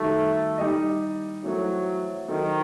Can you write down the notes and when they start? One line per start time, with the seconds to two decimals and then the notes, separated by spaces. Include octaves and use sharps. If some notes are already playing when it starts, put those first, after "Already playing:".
Already playing: D#3 G3 A3 D#4 F#4 A4
0.58 G3 D#4 G4 D#5
1.43 E3 F#3 A3 C4 F#4 A4
2.28 D#3 F#3 C4 D#4 A4